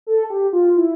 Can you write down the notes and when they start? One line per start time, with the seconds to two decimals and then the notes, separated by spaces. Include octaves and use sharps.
0.07 A4
0.30 G4
0.53 F4
0.77 E4